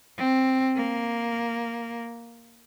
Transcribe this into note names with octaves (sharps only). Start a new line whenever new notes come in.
C4
A#3